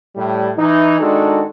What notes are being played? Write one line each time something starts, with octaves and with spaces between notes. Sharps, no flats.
A2 G3
E3 D#4
D#3 G#3 D4 D#4 F#4 A4